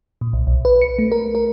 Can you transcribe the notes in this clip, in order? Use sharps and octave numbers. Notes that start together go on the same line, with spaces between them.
A#2
B1
B1
B4
C#7
A3
A#4
A#4